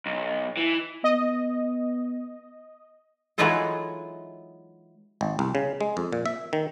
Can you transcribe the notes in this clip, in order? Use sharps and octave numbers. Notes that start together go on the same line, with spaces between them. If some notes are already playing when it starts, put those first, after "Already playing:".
B1
E3
B3 D#5
E3 F#3 G#3 D#4 F4 A4
G#1
C2
C#3
G#3
F2
A#2
E5
D#3